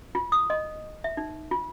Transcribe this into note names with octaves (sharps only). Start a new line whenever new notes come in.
F4
D#6
D#5
E5
D#4
F4